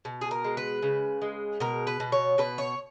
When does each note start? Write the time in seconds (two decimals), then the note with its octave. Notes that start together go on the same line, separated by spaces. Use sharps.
0.05 B2
0.21 G#4
0.31 A#4
0.44 G#3
0.57 B4
0.83 C#3
1.22 G#3
1.60 B2 A#4
1.87 B4
2.00 B2
2.12 C#5
2.38 B2 B4
2.58 C#5